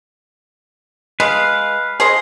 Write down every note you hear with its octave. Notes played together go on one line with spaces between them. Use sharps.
G#3 B4 F5
G#4 C5 D#5